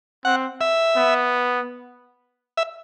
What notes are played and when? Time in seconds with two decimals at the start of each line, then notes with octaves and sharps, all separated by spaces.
0.25 C4 F#5
0.61 E5
0.97 B3
2.57 E5